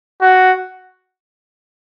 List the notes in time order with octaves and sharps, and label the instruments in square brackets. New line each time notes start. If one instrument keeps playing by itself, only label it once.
[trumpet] F#4